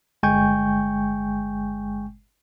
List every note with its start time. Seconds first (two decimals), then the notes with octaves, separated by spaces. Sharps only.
0.23 G1 G#3 G5 G#5 C#6 G6